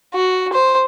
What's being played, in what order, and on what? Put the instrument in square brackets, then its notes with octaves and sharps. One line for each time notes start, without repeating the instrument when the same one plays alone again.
[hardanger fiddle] F#4
C5